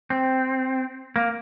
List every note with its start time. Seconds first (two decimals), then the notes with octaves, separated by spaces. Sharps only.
0.10 C4
1.16 A#3